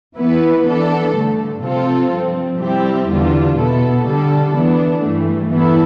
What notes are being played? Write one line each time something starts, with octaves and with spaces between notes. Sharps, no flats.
E3 B3 E4 B4
E3 B3 D4 A4
G2 D3 A3
C3 F3 C4 F4 A4
G2 F3 C4
C3 G3 C4 E4 G4
E2 D3 G3 D4 F4
B2 B3 E4 A4
D3 G3 D4 A4
E3 B3 D4
G2 E3 A3
E3 B3 E4 A4